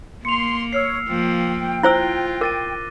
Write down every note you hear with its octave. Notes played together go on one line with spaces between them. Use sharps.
A#3 C6 C#7 F7
C#5 E6 F6 C7
F3 A#3 G5
E4 F4 C5 E6 F#6 A#6 G7
A#4 D6 A6 D#7